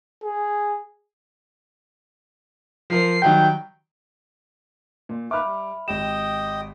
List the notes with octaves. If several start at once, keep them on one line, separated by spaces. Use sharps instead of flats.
G#4
F3 A#4 C5 C7
D#3 F#3 G3 G5
A#2
A#3 D#4 B4 E5 B5 D6 F6
G3
G#1 G4 D#5 G5 D#6 E7